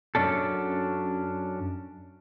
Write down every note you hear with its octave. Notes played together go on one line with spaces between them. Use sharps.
F#2 C3 C#4 D4 A4